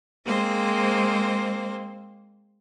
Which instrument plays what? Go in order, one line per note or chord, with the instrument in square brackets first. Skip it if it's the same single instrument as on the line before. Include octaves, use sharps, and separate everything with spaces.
[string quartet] G#3 A#3 C4 C5